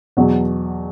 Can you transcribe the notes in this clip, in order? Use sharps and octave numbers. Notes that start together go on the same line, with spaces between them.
E2 B2 F#3